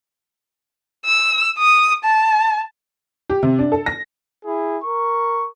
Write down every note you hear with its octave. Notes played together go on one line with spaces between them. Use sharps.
E6
D#6
A5
G4
C3
D4
A4
A#6
E4 G#4
A#4 C#6